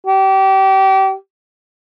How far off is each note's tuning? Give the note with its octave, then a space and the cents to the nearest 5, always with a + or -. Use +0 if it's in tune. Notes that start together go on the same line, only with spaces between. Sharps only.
G4 -30